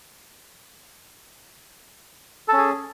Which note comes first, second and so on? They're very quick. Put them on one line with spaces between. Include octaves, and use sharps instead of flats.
A4 C#4 G#4